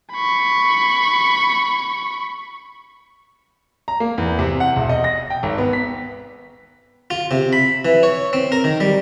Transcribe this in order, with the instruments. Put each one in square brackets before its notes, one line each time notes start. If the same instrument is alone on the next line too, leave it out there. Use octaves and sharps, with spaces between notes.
[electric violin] B5 C#6
[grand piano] A#5
A#3
E2
C3
F#5
E1
D#5
A#6
G5
G#1
B3
B6
[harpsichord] F4
C3
B5
E3
C#5
C4
A#4
D#3
G3